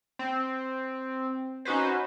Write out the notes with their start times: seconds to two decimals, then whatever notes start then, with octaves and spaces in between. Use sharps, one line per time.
0.19 C4
1.65 C#4 D#4 F#4 B4 C5